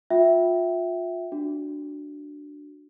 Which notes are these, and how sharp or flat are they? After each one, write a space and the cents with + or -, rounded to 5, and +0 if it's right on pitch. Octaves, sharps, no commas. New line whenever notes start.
F4 +25 E5 +0 G5 -20
D4 +0 F#4 +0